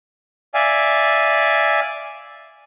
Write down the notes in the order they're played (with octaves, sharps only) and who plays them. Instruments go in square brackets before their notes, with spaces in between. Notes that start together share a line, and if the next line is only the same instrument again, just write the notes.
[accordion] D5 E5 F5 G#5